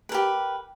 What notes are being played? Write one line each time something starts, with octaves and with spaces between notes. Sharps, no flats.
G4 A#4 B4